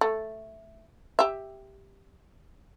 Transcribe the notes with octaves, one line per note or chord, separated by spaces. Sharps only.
A3
G4 E5